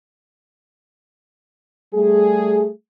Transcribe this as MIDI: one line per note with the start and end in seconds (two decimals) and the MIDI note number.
1.94 2.69 55
1.94 2.69 57
1.94 2.69 68